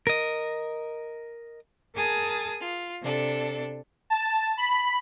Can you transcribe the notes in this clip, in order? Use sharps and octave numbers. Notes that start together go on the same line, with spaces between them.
A#4 D#5
G#4 A#4 G#5 A5 D#6 A6
F4
C3 D4 A4
A5
B5